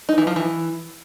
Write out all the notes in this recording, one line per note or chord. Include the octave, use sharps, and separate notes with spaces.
D#4
E3
F3
E3